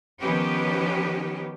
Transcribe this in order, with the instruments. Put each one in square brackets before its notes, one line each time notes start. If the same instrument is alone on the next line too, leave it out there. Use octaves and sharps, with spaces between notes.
[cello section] D#3 F3 B3 C#4 G4 B4